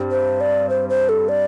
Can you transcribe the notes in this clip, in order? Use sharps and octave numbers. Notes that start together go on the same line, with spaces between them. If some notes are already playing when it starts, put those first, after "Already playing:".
Already playing: G2 G3 C4
C5
D5
C5
C5
A4
D5